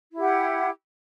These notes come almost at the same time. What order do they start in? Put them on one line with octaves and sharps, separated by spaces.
E4 G4 F#5